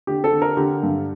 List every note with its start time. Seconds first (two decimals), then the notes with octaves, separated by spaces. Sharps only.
0.07 D3 G4
0.24 A4
0.32 D3
0.42 A#4
0.57 D3 G4
0.83 G2